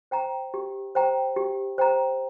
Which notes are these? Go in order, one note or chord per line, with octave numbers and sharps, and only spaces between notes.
C5 G5 A#5
G4
C5 G5 A#5
G4
C5 G5 A#5